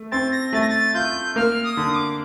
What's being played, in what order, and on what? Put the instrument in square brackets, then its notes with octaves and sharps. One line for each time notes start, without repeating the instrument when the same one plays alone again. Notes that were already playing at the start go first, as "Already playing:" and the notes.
Already playing: [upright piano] A3
[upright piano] C4 [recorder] A6
[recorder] A#6
[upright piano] A3 [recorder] A6
[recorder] A#6
A6
[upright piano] F4 [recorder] G6
[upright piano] A#3 [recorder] F6
[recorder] D#6
[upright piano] D3
[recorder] D#6
D6